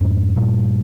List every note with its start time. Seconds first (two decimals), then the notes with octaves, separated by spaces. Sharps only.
0.01 F2 G#2
0.36 G2 A#2